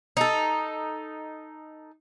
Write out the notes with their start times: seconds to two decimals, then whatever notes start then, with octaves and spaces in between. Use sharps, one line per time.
0.17 D#4 A4